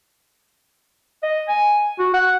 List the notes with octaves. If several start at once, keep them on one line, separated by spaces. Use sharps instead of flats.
D#5
G#5
F#4
F#5